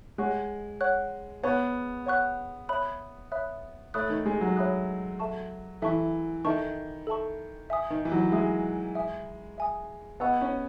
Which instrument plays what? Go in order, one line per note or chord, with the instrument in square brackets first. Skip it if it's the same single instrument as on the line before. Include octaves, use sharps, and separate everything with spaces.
[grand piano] G#3 [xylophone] C#5 F#5 C#6 F#6
[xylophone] C#5 F#5 C#6 F#6
[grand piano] B3 [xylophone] C#5 F#5 C#6 F#6
[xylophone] C#5 F#5 C#6 F#6
C#5 E5 B5 D#6 F#6
C#5 E5 B5 D#6 F#6
[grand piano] A3 [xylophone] C#5 E5 B5 D#6 F#6
[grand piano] D#3
G#3
F#3
[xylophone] C#5 E5 B5 D#6 F#6
A4 E5 A5 C#6
[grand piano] E3 [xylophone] A4 E5 A5 C#6
[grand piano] D#3 [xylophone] A4 E5 A5 C#6
[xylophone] A4 E5 A5 C#6
E5 G#5 D#6
[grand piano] D#3
E3
F#3
[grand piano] G#3 [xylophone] E5 G#5 D#6
[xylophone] E5 G#5 D#6
E5 G#5 D#6
[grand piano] B3 [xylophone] D#5 F#5 C#6 E6
[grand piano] C#4